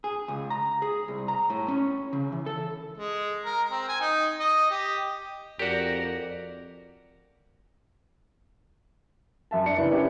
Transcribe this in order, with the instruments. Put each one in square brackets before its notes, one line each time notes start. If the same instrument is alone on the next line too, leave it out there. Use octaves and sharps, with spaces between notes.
[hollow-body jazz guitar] G#4
C#2
A#5
G#4
C2
A#5
A2
C#4
C#3
E3
A4
[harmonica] G#3
A#4
C4
G#5
D#4
D#5
G4
[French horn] F2 [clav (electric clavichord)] F#4 G4 [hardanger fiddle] A#4 [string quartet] D5 A#6
[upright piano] F#2 E5 A5
D4 C#7
[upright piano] F#1 [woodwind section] E3
[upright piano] C#4 D4 G4